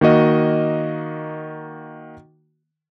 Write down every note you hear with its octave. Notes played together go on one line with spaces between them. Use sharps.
D#3 A#3 F#4 D#5